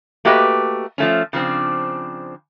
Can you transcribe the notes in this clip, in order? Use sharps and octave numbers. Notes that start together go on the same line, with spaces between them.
A3 A#3 F#4 G4 B4 D#5
F3 A3 C#4
C#3 F3 C4 D4